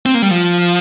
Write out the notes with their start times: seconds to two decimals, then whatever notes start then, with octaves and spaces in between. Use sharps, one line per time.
0.06 C4
0.14 A#3
0.22 G3
0.31 F3